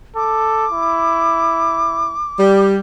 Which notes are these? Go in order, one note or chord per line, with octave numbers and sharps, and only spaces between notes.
A4 D6
E4
G3